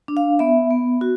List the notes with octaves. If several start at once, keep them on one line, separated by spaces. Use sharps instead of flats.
D4
F5
B3 E5
B3
F#4